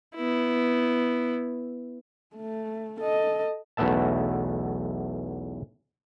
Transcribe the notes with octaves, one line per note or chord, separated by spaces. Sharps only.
B3 E4
A3
A4 D#5
B1 E2 A3 B3 E5 A5